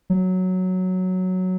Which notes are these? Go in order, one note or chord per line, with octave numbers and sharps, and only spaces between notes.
F#3